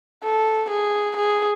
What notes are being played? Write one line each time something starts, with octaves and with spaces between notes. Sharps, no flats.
A4
G#4
G#4